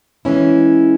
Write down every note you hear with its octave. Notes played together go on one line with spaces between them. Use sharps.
E3 G#3 C#4 E4